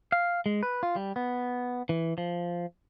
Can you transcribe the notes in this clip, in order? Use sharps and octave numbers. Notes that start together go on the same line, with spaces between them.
F5
G#3
B4
F4
G3
B3
E3
F3